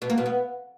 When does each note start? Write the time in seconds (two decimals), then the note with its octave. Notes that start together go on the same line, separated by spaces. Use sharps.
0.02 B2
0.10 A#3
0.18 B2
0.26 B3